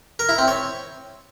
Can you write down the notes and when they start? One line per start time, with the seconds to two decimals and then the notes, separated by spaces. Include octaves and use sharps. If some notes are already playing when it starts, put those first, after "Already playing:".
0.19 A#4
0.29 E4
0.38 C4
0.48 C#5